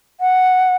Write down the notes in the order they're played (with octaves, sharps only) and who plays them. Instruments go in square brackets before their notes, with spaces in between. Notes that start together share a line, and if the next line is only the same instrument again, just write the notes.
[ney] F#5